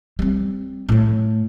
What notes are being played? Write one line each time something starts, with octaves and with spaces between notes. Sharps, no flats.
G3 C4
A2 A3